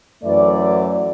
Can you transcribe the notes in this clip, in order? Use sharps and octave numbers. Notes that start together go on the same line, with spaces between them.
F#2 E3 A3 D5